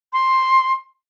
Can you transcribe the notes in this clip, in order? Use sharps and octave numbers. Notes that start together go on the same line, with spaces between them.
C6